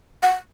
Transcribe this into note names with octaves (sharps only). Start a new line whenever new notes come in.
F#5